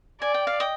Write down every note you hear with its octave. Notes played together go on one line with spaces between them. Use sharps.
D5 G#5
G5
F5
D#5 G5